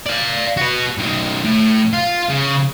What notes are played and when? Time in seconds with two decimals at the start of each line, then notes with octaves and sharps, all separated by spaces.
0.07 D5 F5
0.57 F#4 B4
0.98 B1 D#3
1.44 A2
1.93 F4
2.29 C#3